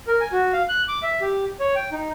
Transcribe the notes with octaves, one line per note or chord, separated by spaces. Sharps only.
A#4
G#5
F#4
F5
F#6
D6
E5
G4
C#5
G5
D#4